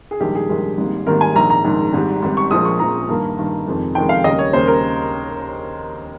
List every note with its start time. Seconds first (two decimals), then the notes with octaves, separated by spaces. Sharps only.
0.11 G#4
0.20 A#1 G#2 D#3 G3 G4
0.35 G#4
0.49 A#1 G#2 D#3 G3
0.78 G#1 G#2 D#3 G3 A#3
1.07 G#1 G#2 D#3 G3 A#3 A#4
1.21 G#5
1.35 A#1 G#2 D#3 A#5
1.50 A#5
1.64 A#1 G#2 D#3
1.93 G#1 G#2 G3
2.22 G#1 G#2 G3
2.37 C#6
2.51 A#1 A#2 F3 G#3 D#6
2.65 C#6
2.79 A#1 A#2 F3 G#3 A#5
3.08 G2 D#3 A#3
3.38 G2 D#3 A#3
3.66 F1 F2 D#3 G#3
3.95 F1 F2 D#3 G#3 G5
4.09 F5
4.24 D#2 C#3 G3 A#3 D#5
4.39 C#5
4.53 D#2 C#3 G3 A#3 C5
4.68 A#4